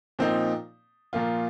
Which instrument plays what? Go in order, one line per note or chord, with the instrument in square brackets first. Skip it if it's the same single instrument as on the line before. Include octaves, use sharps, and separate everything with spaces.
[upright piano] A#2 F3 C4 D#4
A#2 F3 A#3 F4